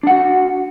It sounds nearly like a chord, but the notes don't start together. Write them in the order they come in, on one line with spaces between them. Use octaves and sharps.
D4 F#5 F#4